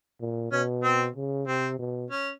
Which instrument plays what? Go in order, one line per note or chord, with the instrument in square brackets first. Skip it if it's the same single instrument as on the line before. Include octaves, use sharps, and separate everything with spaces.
[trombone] A#2
[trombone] B2 [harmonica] C#4
[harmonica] C4
[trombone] C#3
[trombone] C3 [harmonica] C4
[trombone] B2
[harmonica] C#4